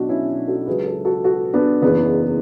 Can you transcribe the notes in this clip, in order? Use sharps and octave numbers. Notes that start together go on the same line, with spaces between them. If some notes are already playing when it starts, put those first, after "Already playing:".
Already playing: B1 B2 F#3 D4 F#4
C#4 E4
F#4 A4
C#2 C#3 F#3 G#4 B4
F#4 A4
F#4 A4
F#4 A4
B3 D4
F#1 E2 C#3 E3 B3